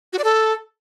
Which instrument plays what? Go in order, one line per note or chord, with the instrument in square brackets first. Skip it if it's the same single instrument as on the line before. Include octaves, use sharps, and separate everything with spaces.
[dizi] F#4
D5
A4